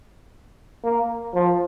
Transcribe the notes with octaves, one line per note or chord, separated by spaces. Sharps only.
A#3
F3